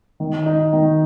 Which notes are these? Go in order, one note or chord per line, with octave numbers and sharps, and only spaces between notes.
D#3
D#4
D#3